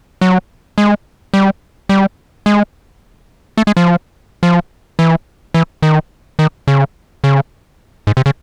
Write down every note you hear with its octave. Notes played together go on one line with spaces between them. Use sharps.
F#3
G#3
G3
G3
G#3
A3
G#3
F3
F3
E3
E3
D#3
D#3
C#3
C#3
G#2
C3
C#3